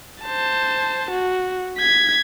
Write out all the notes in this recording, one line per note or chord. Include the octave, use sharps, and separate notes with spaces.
C5 A5
F#4
G#6 B6